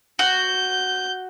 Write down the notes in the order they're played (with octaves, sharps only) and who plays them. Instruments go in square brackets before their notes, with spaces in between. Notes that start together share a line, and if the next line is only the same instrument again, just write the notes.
[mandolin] F#4 [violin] G6